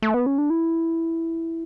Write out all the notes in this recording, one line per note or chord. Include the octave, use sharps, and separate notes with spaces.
A3
B3
C#4
D4
E4